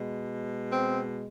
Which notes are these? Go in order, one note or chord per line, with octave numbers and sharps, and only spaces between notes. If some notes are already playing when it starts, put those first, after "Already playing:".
Already playing: B2 G#3
C4